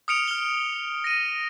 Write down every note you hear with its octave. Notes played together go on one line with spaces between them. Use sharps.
D#6 F6 C#7 D7 F7
F6 G7
A#6 D#7